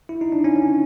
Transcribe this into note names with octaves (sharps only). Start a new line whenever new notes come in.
E4
D#4
D4
C#4
C#4